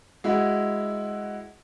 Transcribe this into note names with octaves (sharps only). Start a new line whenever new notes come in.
G#3 E4 F#4